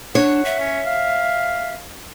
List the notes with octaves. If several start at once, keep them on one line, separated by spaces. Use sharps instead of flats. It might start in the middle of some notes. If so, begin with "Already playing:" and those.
D4 C#5 F#5
E5
C#4
F5